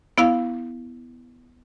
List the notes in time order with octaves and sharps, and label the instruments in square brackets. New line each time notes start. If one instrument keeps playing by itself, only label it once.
[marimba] B3 E4 F5